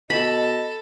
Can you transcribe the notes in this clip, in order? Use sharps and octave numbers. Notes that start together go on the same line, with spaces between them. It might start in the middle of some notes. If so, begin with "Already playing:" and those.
B2 A4 D#5 B5